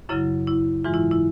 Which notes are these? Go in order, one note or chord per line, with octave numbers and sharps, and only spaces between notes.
F#2 C#3 F#3 E4
E4
G#2 E3 G#3 F4
E4
E4